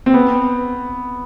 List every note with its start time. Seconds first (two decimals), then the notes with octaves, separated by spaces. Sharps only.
0.06 C4
0.14 B3